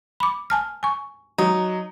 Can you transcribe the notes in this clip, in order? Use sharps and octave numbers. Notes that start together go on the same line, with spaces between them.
B5 D6
G#5 A5 F6
G#5 C#6
F#3 D#4